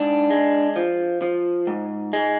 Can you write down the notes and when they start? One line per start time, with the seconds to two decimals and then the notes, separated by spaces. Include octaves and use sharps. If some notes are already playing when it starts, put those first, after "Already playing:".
Already playing: G#2 D4
0.30 G#3
0.76 F3
1.22 F3
1.67 G#2
2.13 G#3